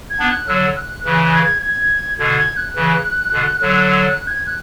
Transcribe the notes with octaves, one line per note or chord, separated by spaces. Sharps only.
G#6
B3 D4
F#6
D3 F#3 E6
F#6
C#3 E3 F#6
G#6
G#6
B2 D3 G#6
G#6
F#6
C#3 E3
B2 D3
D3 F#3
E6
F#6
G#6
F#6